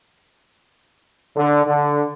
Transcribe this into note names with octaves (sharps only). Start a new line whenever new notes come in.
D3
D3